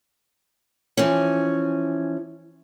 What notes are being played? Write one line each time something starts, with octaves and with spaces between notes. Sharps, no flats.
E3 F3 C#4